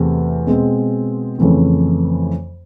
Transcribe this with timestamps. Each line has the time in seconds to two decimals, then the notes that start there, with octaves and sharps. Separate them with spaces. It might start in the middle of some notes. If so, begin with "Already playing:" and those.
Already playing: E2 C3 E3 A3 C4
0.47 B2 G#3 C4
1.38 F2 C#3 E3 A3 C4